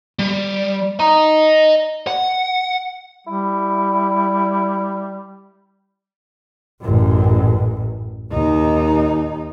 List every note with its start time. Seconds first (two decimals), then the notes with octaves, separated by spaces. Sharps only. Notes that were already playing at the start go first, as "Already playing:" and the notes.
0.19 G3
1.00 D#5 A#5
2.07 F#5
3.27 G3 E4
6.81 A1 F#2
8.32 D#2 D#4